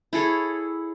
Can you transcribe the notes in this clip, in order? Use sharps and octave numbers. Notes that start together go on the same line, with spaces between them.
E4 G#4 A4 C#5